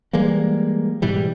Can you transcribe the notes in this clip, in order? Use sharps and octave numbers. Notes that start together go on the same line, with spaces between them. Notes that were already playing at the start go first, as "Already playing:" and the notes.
E3 G3 G#3 A#3
G#2 B2 E3 G3